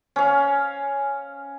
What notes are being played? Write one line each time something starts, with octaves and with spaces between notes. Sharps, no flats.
C#4 F5